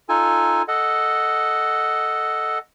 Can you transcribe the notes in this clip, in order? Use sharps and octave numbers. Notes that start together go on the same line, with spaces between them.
D#4 F4 A4 G#5
A4 D#5 F#5